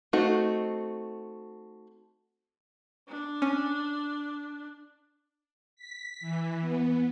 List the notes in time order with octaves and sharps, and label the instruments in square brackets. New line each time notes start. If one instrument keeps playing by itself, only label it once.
[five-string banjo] A3 C4 D#4 F#4
[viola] D4
[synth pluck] C#4
[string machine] B6
E3
B3